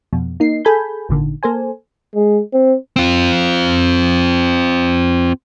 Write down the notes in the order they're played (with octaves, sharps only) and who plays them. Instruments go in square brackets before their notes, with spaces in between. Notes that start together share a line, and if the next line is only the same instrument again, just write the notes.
[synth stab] F2 B2
A#3 D#4 C7
G#4 A4 G#5 B5 G6
G#1 A#2 D3 D#3
A#3 A4 C5 G#5
[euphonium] G#3
C4
[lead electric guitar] C4 F4